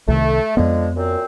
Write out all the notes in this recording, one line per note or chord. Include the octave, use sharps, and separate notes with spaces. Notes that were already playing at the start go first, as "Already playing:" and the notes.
C2 C3 D#3 A3
F2 D3 F3 G#3 B3
F#2 A#2 C4